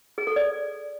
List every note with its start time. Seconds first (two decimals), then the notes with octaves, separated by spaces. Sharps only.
0.18 G#4
0.27 A4
0.36 D5